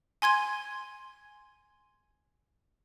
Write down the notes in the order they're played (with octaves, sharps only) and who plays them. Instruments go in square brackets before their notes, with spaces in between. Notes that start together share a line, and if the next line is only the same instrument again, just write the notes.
[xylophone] G#5 C6 G#6 D#7